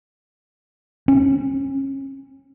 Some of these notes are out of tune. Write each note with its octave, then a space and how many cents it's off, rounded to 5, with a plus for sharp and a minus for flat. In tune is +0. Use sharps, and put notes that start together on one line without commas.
C#4 -30